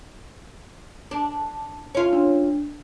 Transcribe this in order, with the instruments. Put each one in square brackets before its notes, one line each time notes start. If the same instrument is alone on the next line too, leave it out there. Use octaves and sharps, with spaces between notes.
[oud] D4
C#4 F4
[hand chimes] D4